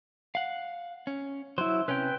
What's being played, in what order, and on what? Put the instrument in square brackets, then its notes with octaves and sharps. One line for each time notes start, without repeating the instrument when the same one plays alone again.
[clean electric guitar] F5 F#5
C#4
[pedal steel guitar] F#3 E4 [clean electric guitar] C5
[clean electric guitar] C3 C#4 [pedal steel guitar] B4 G5